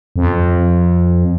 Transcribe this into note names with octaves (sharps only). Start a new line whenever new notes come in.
F2